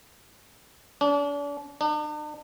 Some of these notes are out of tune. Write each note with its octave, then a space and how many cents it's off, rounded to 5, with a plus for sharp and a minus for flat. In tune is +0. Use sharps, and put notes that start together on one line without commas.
D4 -40
D4 +45